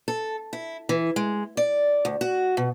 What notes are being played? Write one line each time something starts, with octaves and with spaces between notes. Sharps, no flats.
A4
E4
E3
G#3
D5
D2
F#4
B2